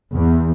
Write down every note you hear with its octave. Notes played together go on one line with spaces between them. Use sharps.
E2